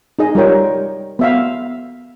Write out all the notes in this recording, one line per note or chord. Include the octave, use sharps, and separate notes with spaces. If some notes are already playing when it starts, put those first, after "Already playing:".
D#4 G#4 D#5
G3 D#4 F4 A#4 C#5 G5
B3 E5 F5